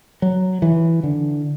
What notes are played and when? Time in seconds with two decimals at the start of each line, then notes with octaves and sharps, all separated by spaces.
0.22 F#3
0.62 E3
1.03 D3